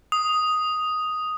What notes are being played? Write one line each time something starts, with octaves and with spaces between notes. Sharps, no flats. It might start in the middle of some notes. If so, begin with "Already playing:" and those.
D#6